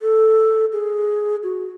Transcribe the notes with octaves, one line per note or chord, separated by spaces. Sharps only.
A4
G#4
F#4